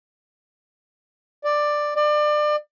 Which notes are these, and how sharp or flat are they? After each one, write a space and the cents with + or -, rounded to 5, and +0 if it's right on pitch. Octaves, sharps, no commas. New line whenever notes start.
D5 +10
D5 +30